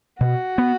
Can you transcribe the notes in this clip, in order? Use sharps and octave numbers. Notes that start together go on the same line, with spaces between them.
B2 F#4
B3